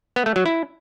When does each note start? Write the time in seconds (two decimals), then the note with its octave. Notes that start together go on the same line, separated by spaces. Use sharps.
0.16 B3
0.26 A3
0.36 F#3
0.46 E4